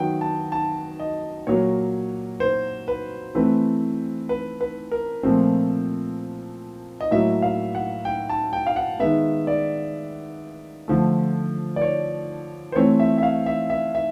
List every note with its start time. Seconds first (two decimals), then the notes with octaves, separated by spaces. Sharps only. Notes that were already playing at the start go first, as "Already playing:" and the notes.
Already playing: D#3 F#3 B3 F#5 G5
0.21 A5
0.52 A5
1.00 D#5
1.47 A#2 F#3 A#3 C#5
2.40 C5
2.88 B4
3.35 E3 A3 C4 B4
4.29 B4
4.61 B4
4.92 A#4
5.23 A#2 F3 A3 C4
7.01 D#5
7.11 A2 F#3 A#3 E5
7.42 F5
7.75 F#5
8.05 G5
8.29 A5
8.53 G5
8.67 F5
8.76 F#5
9.00 D#3 G#3 B3 E5
9.47 D5
10.88 D3 F3 A3
11.76 D5
11.82 C#5
12.72 C5
12.76 E3 A3 C4 C#5
13.00 E5
13.18 E5
13.23 F5
13.46 E5
13.70 E5
13.95 E5